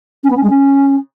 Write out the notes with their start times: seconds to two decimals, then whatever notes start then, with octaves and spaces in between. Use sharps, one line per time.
0.23 C#4
0.30 B3
0.36 C#4
0.43 G#3
0.49 C#4